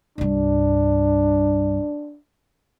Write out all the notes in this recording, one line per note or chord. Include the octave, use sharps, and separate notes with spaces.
C2 G2 D4